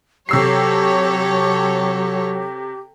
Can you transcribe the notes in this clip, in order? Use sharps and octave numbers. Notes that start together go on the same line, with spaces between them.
C3 F#3 G4 A4 C#5 E6 C7